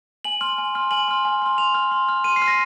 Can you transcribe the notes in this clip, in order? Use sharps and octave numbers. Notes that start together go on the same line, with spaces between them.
G#5 F#7
C6 F6 F#7
G#5
C6 F6
G#5 F#7
C6 F6
G#5
C6 F6
C6 F7
F6
C6
F6
C6 D#7
C7
F6
A#6